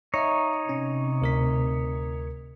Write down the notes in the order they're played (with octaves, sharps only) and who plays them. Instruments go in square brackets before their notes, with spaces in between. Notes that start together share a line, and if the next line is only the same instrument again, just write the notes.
[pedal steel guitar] D#4 C#5 [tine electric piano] D#5 E5 A#5
[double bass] C3 [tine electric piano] C#4
[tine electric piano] D2 A#4 B6